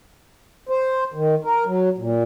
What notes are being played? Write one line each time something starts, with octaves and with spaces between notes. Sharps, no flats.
C5
D#3
A#4
F#3
A#2